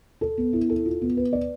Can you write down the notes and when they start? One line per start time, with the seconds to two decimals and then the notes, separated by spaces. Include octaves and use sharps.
0.21 A4
0.38 B3
0.53 E4
0.69 A4
0.85 F4
1.01 B3
1.17 B4
1.33 D5